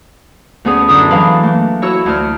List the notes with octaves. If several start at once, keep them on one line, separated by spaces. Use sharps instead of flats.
D2 B3 C#4 G#4
F#2 D3 D4 E4 D#6 E6
E3 F#3 D4 F5 B5
A3 A#3
E4 F#4 C#5 E6
D2 F6